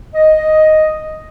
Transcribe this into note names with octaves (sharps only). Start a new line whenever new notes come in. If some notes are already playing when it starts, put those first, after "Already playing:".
D#5